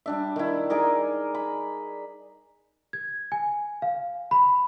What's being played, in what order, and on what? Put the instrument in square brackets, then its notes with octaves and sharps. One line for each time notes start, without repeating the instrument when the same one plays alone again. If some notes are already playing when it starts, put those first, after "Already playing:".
[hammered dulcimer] G3 D4 E5
D#3 E4
D#4 G#4 A#4 D5
B5
[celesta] G#6
G#5
F5
B5